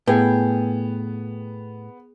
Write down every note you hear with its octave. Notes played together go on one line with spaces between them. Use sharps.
A2 B3 G#4 G5